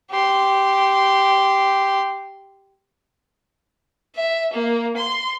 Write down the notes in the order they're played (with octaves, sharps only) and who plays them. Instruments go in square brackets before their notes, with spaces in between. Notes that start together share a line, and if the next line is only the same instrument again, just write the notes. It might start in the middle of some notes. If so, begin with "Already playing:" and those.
[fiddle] G4 C6
[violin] E5
A#3
C6